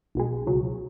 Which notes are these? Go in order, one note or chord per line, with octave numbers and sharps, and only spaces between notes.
B1 B2 G#3
C#2 B2 F#3